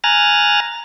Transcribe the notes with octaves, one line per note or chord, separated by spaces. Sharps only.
G#5 A#5 F6 F#6 A6 A#6